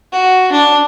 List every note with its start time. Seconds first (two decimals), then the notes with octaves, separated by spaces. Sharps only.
0.12 F#4
0.52 D4